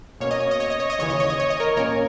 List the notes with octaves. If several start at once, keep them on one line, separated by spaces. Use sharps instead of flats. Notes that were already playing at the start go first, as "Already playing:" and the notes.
B2 A#3 C#4 C#5
D#5
C#5
D#5
C#5
D#5
C#5
D#5
D#2 C#3 E3 C#5
D#5
C#5
D#5
C#5
D#5
A#4 C#5
A#2 A#3 C#4 A#4 C#5